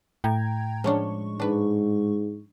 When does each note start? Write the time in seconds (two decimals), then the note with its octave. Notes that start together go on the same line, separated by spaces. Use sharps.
0.24 A2 G5 A#5 G#6
0.84 F3 G#3 C#4 D4 C#6
1.40 G#2 D4 B4